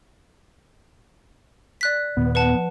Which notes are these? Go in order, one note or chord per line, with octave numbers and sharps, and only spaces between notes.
D5 F#6 B6
D#2 A#2 D#3 B3
B4 F#5 A5
F3